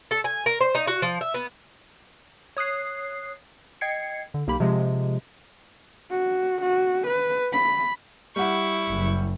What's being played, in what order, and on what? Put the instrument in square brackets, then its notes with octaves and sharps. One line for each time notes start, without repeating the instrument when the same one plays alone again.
[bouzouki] A4
G#5
A#4
C5
D#4
F#4
F3
E5
B3
[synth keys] C#5 D#6 F#6 C7
D#5 G5 G#6 C7 C#7
D3
B1 A#3 G4 B5
C3 F3 G#3
[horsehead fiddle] F#4
F#4
B4
B5
[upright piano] G3 F#5 [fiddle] E4 C#6
[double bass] F#1